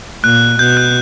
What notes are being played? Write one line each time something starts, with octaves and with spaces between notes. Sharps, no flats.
A#2 F#6
B2 G6
F#6